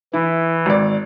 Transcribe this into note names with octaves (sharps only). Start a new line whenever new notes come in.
E3 E4
G#1 D5